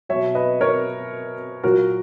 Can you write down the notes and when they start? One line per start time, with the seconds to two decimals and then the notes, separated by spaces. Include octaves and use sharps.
0.09 B2 F#3 C#5 E5
0.35 B4 D#5
0.61 A#4 C#5
1.63 A#2 F#3 F#4 A#4